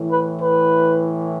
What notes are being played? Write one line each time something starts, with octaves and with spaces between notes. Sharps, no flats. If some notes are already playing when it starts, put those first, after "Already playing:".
Already playing: A2 E3
B4
B4